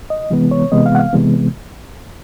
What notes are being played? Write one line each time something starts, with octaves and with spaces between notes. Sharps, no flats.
D#5
C3 E3 G#3 B3
C#5
C3 E3 G#3 B3 D#5
F5
F#5
F5
C3 E3 G#3 B3